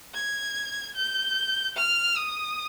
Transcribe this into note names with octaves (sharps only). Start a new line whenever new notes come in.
G#6
G6
F6
D#6